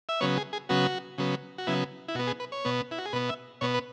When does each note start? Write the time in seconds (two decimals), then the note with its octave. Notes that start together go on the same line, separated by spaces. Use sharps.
0.09 E5
0.21 C#3 F#3 B3 C#5
0.38 G#4
0.53 G#4
0.69 C#3 F#3 B3 F#4
1.18 C#3 F#3 B3
1.58 F#4
1.67 C#3 F#3 B3 E4
2.08 E4
2.15 B2 F#4
2.19 B3
2.27 G#4
2.40 B4
2.52 C#5
2.65 B2 B3
2.91 E4
2.98 F#4
3.06 G#4
3.13 B2 B3 B4
3.29 E5
3.61 B2 B3 C#5
3.74 B4